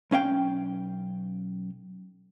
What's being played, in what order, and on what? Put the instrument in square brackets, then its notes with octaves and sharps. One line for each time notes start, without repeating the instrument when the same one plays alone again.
[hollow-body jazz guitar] B1 C#4 F5 G5